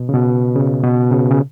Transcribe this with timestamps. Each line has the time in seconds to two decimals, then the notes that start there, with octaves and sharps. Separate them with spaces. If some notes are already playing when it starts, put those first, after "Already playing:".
Already playing: B2
0.09 C#3
0.13 B2
0.56 C#3
0.83 B2
1.12 C#3
1.31 C#3